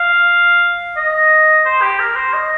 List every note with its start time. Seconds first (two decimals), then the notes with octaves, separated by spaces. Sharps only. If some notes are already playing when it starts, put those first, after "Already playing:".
Already playing: F5
0.97 D#5
1.65 C5
1.82 G4
2.00 A#4
2.16 C5
2.33 D#5